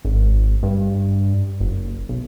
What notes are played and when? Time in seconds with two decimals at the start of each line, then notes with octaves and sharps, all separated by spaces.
0.05 G#1
0.63 G2
1.60 F#1
2.09 B1